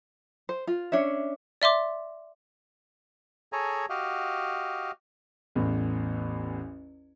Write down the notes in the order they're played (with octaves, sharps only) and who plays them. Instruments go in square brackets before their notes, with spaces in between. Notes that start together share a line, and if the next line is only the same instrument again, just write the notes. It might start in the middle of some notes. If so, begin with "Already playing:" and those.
[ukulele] C5
F4
C#4 D4 C#5 E5
[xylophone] D5 E5 C6 D6
[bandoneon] G#4 A4 C#5 G#5 A#5
F#4 G4 D#5 F5
[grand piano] A1 E2 A2